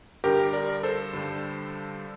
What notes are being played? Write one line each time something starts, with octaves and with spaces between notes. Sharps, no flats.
G2 D3 G3 G4 A#4
A#4 D5
A4 C5
G2 D3 G3